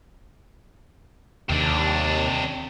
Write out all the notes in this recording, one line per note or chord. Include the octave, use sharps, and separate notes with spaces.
D#2 C3 D4